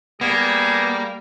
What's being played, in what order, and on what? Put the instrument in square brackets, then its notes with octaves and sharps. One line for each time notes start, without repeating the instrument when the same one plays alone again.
[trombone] G3 [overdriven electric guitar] A#3 [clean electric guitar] B3 [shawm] G#4